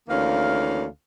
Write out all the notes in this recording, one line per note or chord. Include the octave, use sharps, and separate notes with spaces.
D2 D#3 E3 A#3 C#4 F5